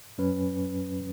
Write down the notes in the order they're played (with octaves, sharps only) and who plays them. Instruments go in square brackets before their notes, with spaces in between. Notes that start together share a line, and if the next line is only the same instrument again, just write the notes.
[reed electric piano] F#2 F#3 C#4 B4